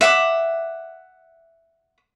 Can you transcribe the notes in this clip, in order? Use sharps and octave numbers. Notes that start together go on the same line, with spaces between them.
E5 F#5 D6